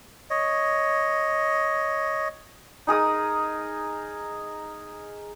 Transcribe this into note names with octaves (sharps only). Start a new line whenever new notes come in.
C#5 D#5
D#4 G#4 A#4 D#6